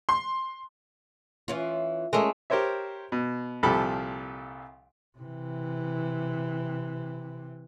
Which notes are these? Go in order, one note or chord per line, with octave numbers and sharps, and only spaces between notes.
C6
E3 C#4 F4
G#3 A3 C#4 A#4
G4 A#4 C5 C#5 E5
B2
C2 A#2 F3 G4 A4 B5
C3 E3